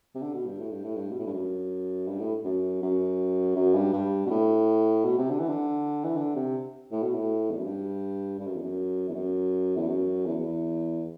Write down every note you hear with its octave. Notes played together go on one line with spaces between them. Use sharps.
C3
D3
B2
G2
A2
G2
A2
G2
B2
A2
G2
F#2
G2
A2
F#2
F#2
F#2
G2
G2
B2
A2
B2
C3
D3
E3
D3
E3
D3
C3
A2
B2
A2
E2
F#2
G2
G2
F#2
E2
F#2
E2
F#2
E2
F#2
E2
E2